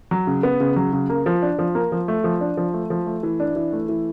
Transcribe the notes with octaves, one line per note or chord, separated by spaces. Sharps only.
F#3
C#3
B3
C#3
F#3
C#3
A#3
F3
D4
F3
A#3
F3
A3
F3
D4
F3
A3
F3
A3
E3
D4
E3
A3
E3